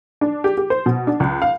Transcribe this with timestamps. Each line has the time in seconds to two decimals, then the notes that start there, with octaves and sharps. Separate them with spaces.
0.21 D4
0.44 G4
0.57 G4
0.70 C5
0.86 B2
1.07 D4
1.20 C#2
1.42 F5